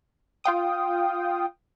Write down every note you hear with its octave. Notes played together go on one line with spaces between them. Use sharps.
F4 F5 G5 D#6